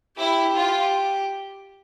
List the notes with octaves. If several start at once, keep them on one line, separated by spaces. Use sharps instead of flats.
E4 G4
F4